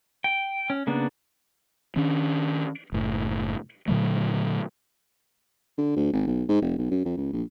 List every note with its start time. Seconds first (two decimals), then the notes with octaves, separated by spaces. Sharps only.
0.24 G5
0.70 C#4
0.87 C#3 A#3 B3 D4
1.96 D#3 C#4 D4
2.92 F#1 A2
3.88 A#2 D3 F#3 A3
5.78 D3
5.96 D2
6.13 G#1
6.27 B1
6.49 G#2
6.62 F1
6.78 B1
6.90 F#2
7.05 F2
7.17 C#2
7.33 A#1